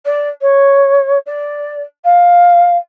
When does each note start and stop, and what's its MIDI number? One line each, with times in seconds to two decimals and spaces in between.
0.05 0.28 74
0.41 1.18 73
1.26 1.82 74
2.04 2.77 77